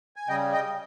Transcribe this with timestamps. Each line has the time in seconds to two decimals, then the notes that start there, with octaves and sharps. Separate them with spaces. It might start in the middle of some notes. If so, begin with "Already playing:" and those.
0.16 G#5
0.28 C#3 G3 D#5 G5
0.53 D#5 G5